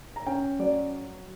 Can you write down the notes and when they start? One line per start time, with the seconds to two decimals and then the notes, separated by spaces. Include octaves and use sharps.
0.16 A#5
0.26 C#4 G5
0.59 F#3 D5